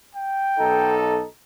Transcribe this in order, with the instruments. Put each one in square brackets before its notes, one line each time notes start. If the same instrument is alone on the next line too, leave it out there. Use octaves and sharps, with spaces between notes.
[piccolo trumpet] G5
[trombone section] B1 D#4 A4